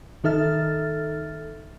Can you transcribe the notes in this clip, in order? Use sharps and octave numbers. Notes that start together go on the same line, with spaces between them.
D#3 D#4 A4 E5 F6 A6